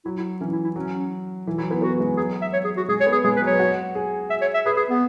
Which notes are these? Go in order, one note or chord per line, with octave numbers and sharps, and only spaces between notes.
F#3 E4
E4
E3 C#4
E4
E4
F#3 C#4
E3 E4
F#3 E4
B3 E4
B3 F#4
G#3
F#3 G#4
E5
C#5
G#4
F#4
G#3 G#4
C#5
B3
G#4
G#3 G#4
B4
F#3 C#5
F#4
G#4
E5
C#5
E5
G#4 B4
G#4
B3